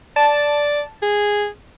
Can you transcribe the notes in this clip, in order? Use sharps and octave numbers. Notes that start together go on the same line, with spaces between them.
D5 A5
G#4